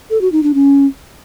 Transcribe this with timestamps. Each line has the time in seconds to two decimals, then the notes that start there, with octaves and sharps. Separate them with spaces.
0.10 A4
0.21 F#4
0.32 D#4
0.43 D4
0.54 C#4